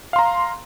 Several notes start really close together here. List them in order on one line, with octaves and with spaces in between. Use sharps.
F5 C6 A#5